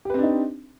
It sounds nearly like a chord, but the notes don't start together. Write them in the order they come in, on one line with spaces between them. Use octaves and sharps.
G4 B4 C4 D4 D#4